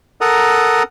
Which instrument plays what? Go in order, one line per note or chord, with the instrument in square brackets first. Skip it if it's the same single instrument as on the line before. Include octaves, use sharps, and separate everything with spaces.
[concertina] A4 A#4 F#5 A#5 D#6